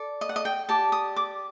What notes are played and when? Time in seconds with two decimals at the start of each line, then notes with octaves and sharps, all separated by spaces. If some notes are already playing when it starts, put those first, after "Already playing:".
Already playing: A4 D5
0.21 D#5
0.29 F#5
0.36 D#5
0.45 G5
0.69 G4 D5 A5
0.92 D#6
1.16 D6